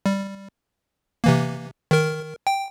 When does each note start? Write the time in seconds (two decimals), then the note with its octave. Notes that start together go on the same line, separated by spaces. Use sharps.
0.06 G3
1.24 C3 E3 A#3
1.91 D#3 A#4
2.47 G5